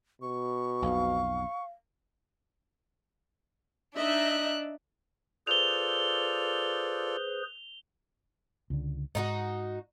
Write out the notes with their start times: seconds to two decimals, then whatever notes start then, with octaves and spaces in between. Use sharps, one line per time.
0.22 B2 C#6
0.82 B1 F2 F5
3.96 D4 D#4 D#5 E5 F#6
5.47 F4 G#4 A4 B4 C5 D5 F7 G7
8.70 C#2 D3
9.15 G#2 D#4 F4 F#4